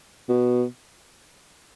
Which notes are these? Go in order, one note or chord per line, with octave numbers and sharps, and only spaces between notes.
B2